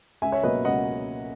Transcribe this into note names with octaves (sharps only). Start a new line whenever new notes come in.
C#2 E5 G#5
C#5 E5
B2 F#3 A#3 B4 D#5
C#2 D#5 F#5